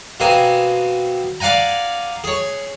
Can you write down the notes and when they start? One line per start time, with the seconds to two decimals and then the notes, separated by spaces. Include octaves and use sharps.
0.20 B2 A#3 C4 G#5 D#6
1.40 D5 F5 F#5 G#5 A#5
2.24 G#4 C#5